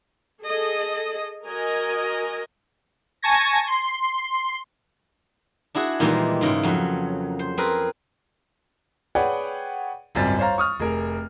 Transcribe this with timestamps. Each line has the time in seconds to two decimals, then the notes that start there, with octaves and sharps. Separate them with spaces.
0.42 G#4 A4 D#5
1.45 F#4 A#4 D#5 G#5
3.22 G#5 A5 C#6 G#6 A#6
3.67 C6
5.75 D4 E4 F#4 G#4
6.00 A#2 D#3 E3 G3 G#3 A#3
6.41 G#2 C#3 E4
6.63 F2 F#3
7.39 C5
7.58 C4 G#4 A#4 B4
9.15 G#4 B4 C#5 D5 F#5 G5
10.15 G#1 C#2 F#2 G3 C4 A6
10.39 C5 C#5 F5 A#5
10.58 C#6 D#6 F6
10.80 F1 G#4 A#4